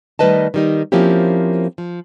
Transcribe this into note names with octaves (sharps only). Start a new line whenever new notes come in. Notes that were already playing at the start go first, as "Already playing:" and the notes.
D#3 G3 A3 B4 D#5 A5
D#3 G3 D#4
F3 A#3 C4 C#4 E4 G4
F3